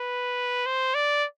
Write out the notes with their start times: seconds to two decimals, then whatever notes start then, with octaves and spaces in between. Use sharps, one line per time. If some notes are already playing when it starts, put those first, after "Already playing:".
Already playing: B4
0.66 C5
0.95 D5